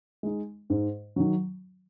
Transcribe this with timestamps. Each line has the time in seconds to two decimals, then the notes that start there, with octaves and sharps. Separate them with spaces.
0.23 G#3 D#4
0.70 G#2
1.16 D#3 F#3